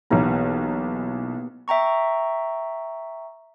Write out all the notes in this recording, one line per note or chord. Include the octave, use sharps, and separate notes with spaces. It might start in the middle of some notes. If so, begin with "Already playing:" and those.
B1 E3 A#3 B3 G4 A#5
E5 G5 A#5 C#6